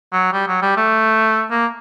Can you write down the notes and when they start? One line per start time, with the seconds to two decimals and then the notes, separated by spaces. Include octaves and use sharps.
0.13 F#3
0.33 G3
0.48 F#3
0.62 G3
0.77 A3
1.51 A#3